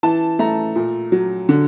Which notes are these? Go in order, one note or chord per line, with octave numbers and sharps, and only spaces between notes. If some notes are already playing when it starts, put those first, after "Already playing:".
E3 A5
A3 A#5
A#2
F#3
D3